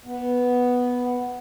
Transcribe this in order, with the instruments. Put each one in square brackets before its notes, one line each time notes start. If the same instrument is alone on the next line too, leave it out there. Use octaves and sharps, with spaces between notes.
[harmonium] B3